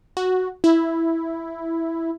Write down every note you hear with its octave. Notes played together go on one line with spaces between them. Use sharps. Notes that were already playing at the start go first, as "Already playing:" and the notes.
F#4
E4